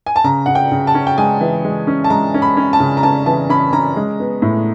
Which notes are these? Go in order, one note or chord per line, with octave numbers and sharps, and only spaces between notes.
G#5
A5
C#3 A#5
C#3 F#5
G5
C#3
A5
C#4
G5
G#3 G#5
E3
G#3
C#4
A5
G#3 A#5
C#4
B5
C#4
A5
C#3
A#5
C#4 A5
E3 A5
C#4 B5
C#4 A#5
G#3
B3
A2